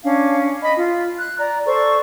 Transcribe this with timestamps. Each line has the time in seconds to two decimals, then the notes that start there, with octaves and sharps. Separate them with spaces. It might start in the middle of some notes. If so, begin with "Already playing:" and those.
0.04 C#4 D4 F5
0.63 D#5 B5
0.77 F4
1.18 F#6
1.39 D5 A#5
1.66 A4 C5 D5 C#6